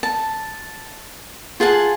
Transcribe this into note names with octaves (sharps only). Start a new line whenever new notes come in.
A5
F4 G#4 F#5 A5